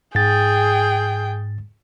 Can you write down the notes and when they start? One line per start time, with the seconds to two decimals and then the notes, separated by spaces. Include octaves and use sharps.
0.15 G#2 G#4 G5 A6